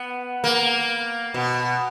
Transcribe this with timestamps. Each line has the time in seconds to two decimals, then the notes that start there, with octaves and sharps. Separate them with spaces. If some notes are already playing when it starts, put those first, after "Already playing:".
Already playing: B3
0.44 A#3
1.34 B2